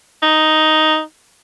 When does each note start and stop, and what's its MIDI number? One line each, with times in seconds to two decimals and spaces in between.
0.23 1.00 63